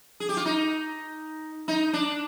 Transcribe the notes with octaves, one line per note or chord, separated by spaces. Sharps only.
G#4
G4
F4
D#4
D#4
D4